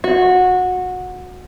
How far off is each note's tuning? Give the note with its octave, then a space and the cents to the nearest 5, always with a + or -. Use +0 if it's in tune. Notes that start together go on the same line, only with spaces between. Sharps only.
F#4 -20